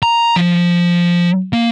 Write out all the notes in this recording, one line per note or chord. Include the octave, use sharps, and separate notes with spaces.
A#5
F3
A#3